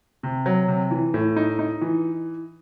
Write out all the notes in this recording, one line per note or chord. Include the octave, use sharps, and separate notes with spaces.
C3
F#3
C3
E3
A2
D#4
D#4
E3